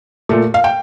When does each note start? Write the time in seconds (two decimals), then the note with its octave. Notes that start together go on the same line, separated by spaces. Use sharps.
0.29 A#2 A3
0.54 F5
0.64 G5